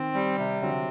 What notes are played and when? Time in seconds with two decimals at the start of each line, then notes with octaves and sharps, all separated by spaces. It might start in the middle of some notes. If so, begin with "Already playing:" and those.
Already playing: D#3 C4
0.15 G3
0.38 C3
0.62 D3 F#3 C4